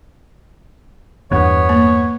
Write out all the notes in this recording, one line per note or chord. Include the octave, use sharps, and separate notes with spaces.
E2 G2 B3 C#5
A#3